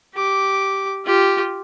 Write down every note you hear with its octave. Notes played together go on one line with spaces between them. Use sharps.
G4 D6
F4 G4